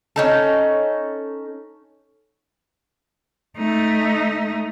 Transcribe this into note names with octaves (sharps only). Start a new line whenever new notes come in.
C#4 D#4 A4
A3 D#4